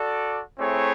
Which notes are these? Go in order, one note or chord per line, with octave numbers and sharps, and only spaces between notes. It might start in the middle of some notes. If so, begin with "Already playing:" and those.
Already playing: F#4 A4 D5
A3 C4 E4 G#4 C#5